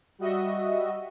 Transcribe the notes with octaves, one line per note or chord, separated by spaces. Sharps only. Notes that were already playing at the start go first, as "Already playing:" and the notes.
G3 F#4 D#5 E5